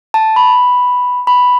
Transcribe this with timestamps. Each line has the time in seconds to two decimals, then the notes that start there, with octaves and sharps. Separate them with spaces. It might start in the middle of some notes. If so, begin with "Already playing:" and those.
0.14 A5
0.36 B5
1.27 B5